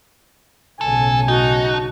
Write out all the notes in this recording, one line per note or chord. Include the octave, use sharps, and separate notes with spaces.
B1 A2 C#3 A4 G#5
D#4 F#4 A5